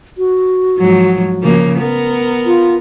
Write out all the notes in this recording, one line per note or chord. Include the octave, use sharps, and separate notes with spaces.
F#4
G#2 F3 F#3
C#3 F3 A#3
B3 A#4
F4